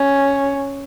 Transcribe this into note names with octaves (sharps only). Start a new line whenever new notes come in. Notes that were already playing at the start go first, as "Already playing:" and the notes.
Already playing: C#4